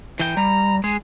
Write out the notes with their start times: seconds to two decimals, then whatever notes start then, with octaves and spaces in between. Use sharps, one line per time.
0.20 E3 G5
0.37 G3 A#5
0.84 G#3 G#4